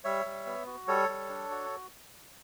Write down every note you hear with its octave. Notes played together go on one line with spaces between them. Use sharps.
G3 C#5 E5
G3
B3
F#4
G3 A4 C#5
G3
D4
F#4